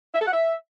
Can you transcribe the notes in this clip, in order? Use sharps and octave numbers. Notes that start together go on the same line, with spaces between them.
E5
A4
F#5
E5